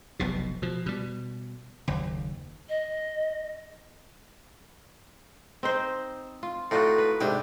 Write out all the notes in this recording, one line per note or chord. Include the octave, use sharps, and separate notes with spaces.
F1 B1 B2
B2 F3
B2 G3
F#1 D#2
D#5
C4 D#4 C5
F4
A2 D#4 F4 F#4
B4
G#2 C3 D4 G4